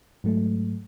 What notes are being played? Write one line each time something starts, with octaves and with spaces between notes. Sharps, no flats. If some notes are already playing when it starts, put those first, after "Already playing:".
G#2 F#3 A3